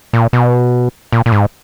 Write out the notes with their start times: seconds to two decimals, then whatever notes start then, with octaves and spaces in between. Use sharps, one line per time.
0.13 A#2
0.33 B2
1.12 A#2
1.26 A#2
1.32 G#2